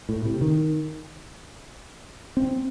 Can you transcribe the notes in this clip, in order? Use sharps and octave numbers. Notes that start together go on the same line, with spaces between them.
A2
C3
D#3
C4